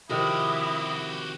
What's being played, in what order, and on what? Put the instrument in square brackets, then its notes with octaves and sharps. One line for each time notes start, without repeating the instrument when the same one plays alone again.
[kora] C3 D#3 F3 [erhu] E4 [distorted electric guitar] F#4 G4 [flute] D#6